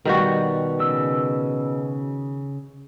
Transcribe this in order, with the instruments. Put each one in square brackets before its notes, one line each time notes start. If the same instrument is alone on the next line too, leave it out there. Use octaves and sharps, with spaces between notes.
[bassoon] B2 [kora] D#3 G3 F#4
[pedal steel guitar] C#3 E6